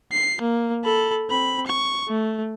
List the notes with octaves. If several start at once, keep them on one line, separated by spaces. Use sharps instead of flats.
C7
A#3
A4 B5
C4 B5
C#6
A3